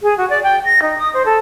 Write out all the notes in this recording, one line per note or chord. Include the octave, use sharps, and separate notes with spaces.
G#4
F#4
D5
G5
A#6
D#4
D#6
C5
A4